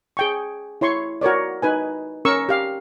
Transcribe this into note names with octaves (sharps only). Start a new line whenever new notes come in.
G#4 G5 C#6
E4 C#5 C6 C#6
F#4 A#4 C#5 D5
D#4 B4 G#5
C#4 A#4 C#6 E6
G4 F5